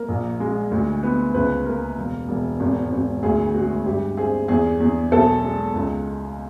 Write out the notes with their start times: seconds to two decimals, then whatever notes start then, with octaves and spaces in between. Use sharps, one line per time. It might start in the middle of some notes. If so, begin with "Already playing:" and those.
Already playing: A#3 A#4
0.08 A#1
0.40 G#3
0.71 D2
1.03 B3
1.34 C#2 B4
1.65 A#3 A#4
1.97 E1
2.29 E1
2.60 G#1
2.92 G#1
3.23 D2 G#4
3.54 G#3 F#4
3.86 G2 G4
4.17 C4 G#4
4.48 E2 G#4
4.80 E2
5.12 B1 A4
5.43 G#3
5.75 C#2